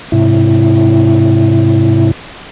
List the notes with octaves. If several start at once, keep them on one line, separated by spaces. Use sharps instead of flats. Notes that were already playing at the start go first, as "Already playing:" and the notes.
G#2 C3 E4